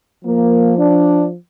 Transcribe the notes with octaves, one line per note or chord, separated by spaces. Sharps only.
F3 A#3
D4